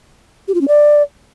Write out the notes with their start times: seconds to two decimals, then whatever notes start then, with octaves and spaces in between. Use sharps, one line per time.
0.48 G4
0.55 F4
0.61 C#4
0.68 D5